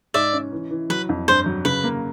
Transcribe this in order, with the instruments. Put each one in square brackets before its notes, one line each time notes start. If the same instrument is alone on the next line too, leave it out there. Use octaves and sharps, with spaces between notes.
[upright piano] G#2 [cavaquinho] D5 E5
[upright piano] C#4
E3
E3
[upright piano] F#3 [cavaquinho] B4
[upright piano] F2
[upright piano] G2 [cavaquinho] C5
[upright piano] F#3
[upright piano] C#3 [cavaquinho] B4
[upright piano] A#3